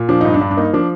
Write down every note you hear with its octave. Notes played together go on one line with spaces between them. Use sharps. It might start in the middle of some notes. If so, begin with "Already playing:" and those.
Already playing: A#2
F3 D4
G2 D#4
D4
G2
D4
A#3 D#4
F3 D4